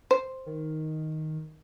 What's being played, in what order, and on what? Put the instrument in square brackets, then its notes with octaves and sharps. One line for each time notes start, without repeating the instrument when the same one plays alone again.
[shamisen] C5
[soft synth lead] D#3